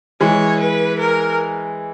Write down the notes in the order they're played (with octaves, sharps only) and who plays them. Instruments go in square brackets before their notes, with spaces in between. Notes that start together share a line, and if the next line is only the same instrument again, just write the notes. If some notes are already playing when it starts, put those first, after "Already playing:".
[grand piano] E3 G#3 [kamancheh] C#5
[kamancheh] B4
A#4